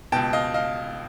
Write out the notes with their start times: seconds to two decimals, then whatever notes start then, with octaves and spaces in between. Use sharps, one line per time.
0.12 C#2 B2 G5 A5
0.33 D#5 F5
0.54 D#5 F5